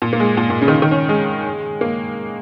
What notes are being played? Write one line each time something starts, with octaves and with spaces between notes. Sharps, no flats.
A#2
A#3
G#3
A#2
A#2
C#3
D#3
C#3
D#3
C#4
G#3
A#3